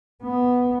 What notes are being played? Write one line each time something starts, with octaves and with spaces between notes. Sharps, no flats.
B3